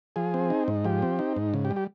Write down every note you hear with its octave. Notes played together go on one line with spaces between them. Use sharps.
F3 G#4
C4
D#4
G#2
F3 G4
C4
D#4
G#2
C#3
G4
G3
G4